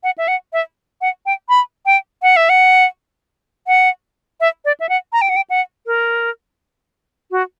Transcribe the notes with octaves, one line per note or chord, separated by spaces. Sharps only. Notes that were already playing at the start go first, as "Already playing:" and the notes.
F#5
E5
F#5
E5
F#5
G5
B5
G5
F#5
E5
F#5
F#5
E5
D5
E5
F#5
A#5
G5
F#5
G5
F#5
A#4
F#4